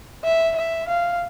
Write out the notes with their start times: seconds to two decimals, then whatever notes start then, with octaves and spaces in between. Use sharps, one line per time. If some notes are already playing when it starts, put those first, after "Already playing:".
0.24 E5
0.56 E5
0.88 F5